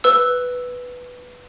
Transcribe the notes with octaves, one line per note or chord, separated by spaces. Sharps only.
B4 E6